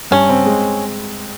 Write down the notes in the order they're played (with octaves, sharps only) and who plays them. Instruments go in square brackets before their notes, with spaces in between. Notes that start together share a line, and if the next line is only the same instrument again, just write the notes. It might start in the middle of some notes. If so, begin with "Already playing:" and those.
[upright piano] G2 [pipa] C#4
[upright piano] C4
G#3